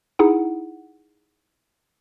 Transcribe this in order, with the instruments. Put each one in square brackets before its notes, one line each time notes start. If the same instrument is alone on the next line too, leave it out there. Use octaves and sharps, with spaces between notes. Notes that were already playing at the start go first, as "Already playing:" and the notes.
[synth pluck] D#4 E4 G#4 F#5